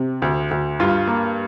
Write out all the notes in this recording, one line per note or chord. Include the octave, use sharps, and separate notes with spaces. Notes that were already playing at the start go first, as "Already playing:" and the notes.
Already playing: C3
D2
D2
G2 F4
A#3